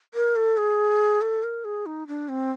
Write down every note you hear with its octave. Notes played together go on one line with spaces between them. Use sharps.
A#4
A4
G#4
A4
A#4
G#4
D#4
D4
C4